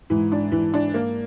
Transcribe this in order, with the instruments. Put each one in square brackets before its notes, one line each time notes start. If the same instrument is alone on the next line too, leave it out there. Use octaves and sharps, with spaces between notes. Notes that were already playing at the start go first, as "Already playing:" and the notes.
[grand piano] G#2 [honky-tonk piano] E3
[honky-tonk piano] D4
[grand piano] G#2 [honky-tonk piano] E3
[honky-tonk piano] D4
A#3